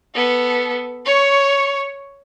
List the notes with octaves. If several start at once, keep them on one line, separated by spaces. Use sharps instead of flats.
B3 A4
C#5 C#6